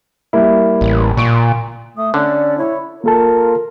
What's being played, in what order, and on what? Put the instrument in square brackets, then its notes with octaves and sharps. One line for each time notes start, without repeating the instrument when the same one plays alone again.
[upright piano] G3 A#3 E4
[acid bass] A1
[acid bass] A#2 [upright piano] C#6 D7
[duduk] A3 [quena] D#6
[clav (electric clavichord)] D3 [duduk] C#4 [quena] D5
[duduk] E4 [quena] C#5
[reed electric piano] A#3 A4 A5 [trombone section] F4 A#4